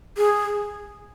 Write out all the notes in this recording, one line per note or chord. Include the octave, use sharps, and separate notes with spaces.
G#4